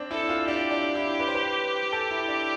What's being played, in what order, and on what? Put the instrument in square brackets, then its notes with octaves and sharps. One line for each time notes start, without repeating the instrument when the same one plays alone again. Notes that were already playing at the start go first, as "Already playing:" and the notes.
Already playing: [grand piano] C4 D4
[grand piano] E4 [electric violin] A4
[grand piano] F4
[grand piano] D4 [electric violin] G4
[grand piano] D4
E4
B4
C5
B4
A4
E4
D4